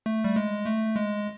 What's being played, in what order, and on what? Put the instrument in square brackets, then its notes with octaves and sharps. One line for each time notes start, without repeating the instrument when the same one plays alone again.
[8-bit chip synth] A3
G3
G#3
A3
G#3